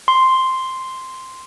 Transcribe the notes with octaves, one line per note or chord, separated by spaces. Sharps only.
C6